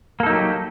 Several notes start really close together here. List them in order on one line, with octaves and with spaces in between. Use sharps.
A#3 A4 D#4 F#3 G4